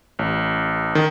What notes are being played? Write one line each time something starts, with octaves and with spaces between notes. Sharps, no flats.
A1
D#3